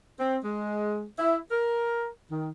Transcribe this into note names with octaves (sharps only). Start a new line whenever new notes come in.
C4
G#3
E4
A#4
D#3